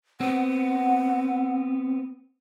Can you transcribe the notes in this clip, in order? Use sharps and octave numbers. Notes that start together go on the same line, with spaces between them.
B3 C4 F#5